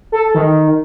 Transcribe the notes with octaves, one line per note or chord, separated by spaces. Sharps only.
A4
D#3